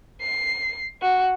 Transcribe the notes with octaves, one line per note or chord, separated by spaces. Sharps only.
C7
F#4